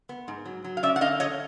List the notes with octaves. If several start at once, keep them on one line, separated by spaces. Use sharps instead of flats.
B3
G#2
F#3
F#3
F5
C#4 D5 E5
F#5
D3 D#5 F5
C#4 C#5 D#5